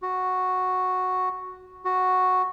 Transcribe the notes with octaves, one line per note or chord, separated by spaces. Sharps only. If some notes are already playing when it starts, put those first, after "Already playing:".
F#4
F#4